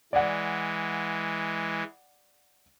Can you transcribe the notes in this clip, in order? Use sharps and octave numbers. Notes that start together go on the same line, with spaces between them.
E3 G#3 D5 F#5